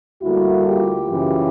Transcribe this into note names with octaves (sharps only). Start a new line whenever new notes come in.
D2 D3 G3 A#3 E4 F#4
F4 G4
F#2 C#3 E3